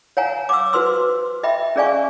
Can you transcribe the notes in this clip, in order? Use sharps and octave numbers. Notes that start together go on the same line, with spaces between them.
C#5 F5 F#5 G#5 A#5
D6 E6
F#4 B4 C5 C6 E6
D#5 E5 G5 B5
C#4 G#4 D5 F5 G#5 C#6